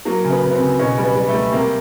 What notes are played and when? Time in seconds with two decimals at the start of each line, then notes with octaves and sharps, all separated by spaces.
0.05 F#3 A#3
0.24 C#3
0.30 B3
0.43 C#3
0.51 B3
0.55 C4
0.60 C#3
0.79 B2 C#4
0.98 G3
1.04 B3
1.16 G3
1.28 A3
1.34 G3
1.52 C3 A#3